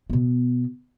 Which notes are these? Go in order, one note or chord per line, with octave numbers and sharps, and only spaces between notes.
B2 B3